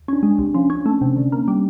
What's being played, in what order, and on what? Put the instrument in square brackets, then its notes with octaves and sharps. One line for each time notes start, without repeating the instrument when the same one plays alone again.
[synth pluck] C#4 [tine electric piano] D4
[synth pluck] G#3
C2
[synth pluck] F3 [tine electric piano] C#4
[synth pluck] C#4
[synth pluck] A3 [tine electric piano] C4
[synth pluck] C3
D3
A#3
G3